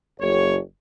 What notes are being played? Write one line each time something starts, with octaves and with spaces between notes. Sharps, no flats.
F#1 C#5